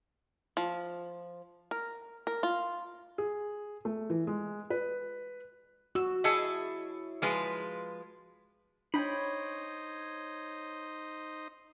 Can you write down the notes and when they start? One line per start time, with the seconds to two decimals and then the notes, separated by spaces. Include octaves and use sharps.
0.57 F3
1.71 A#4
2.27 A#4
2.43 F4
3.18 G#4
3.85 A3
4.10 E3
4.27 G#3
4.70 B4
5.95 F#4 E6
6.24 E4 G#4 C#5 D#5 A5
7.22 F3 G#3 B4
8.94 D4 D#4 C5 C#5 D#5 G5 B5